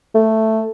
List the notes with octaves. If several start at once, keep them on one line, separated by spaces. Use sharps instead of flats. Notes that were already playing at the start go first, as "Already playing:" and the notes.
A3